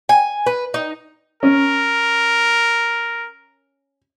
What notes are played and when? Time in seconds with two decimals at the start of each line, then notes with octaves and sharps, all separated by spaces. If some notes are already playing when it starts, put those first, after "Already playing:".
0.09 G#5
0.46 B4
0.74 D#4
1.43 C#4 A#4